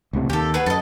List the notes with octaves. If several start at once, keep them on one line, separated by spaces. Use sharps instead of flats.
C#2 A2 C3
D#2 D#3 G4 A4
B3 G#4 B4
F#2 A4 D#5